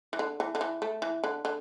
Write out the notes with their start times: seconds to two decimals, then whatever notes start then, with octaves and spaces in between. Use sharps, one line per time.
0.13 E3
0.19 D3
0.40 E3
0.55 D3
0.61 E3
0.82 A3
1.02 E3
1.24 D3
1.45 D3